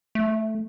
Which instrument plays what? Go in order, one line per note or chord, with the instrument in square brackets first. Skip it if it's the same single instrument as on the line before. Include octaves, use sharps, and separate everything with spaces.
[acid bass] A3